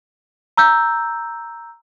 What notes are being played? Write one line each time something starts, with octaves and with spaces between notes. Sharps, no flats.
A#5 E6 G6